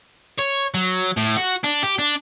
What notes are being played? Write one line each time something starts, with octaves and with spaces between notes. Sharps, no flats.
C#5
F#3
A2
F#4
D4
G4
D4